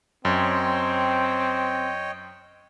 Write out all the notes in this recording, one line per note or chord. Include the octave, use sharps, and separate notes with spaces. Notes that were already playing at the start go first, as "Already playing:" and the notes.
F#2 C4 C#5 D#5 G5